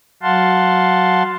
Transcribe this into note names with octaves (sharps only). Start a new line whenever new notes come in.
F#3 F5 F#5 A5 C6